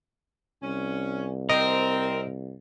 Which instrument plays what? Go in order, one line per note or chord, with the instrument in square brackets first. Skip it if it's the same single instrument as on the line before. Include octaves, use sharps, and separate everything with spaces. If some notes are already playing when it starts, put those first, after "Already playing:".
[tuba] C2 [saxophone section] C#4
[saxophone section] C4 [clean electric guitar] A#4 [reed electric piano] D#5